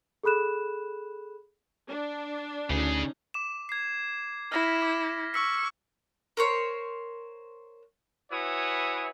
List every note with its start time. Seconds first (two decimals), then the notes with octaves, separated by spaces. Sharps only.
0.23 G#4 A4 B5 F#6 E7
1.88 D4
2.70 D2 C#3 C#4 D#4 G#4
3.34 D6 E7
3.69 G#6 C7
4.52 E4 F6 A#6 B6
4.82 D6
5.34 C#6 E6 B6
6.37 A#4 C5 C#5
8.31 E4 F#4 B4 C#5 G#5 D#6